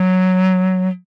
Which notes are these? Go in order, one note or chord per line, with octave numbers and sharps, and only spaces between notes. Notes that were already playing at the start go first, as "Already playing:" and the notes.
Already playing: F#3